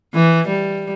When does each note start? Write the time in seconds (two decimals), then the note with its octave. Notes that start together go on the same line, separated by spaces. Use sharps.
0.14 E3
0.47 G3